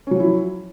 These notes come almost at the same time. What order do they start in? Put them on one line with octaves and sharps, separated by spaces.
C#4 F#3 F3 E4